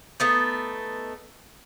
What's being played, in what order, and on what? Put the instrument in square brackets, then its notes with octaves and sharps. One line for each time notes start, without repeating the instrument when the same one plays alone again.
[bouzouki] A3 B3 D#4